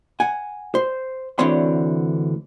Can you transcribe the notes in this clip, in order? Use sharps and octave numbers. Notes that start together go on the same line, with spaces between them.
F#5 G#5
C5
D2 D3 E3 C4 C#5 C6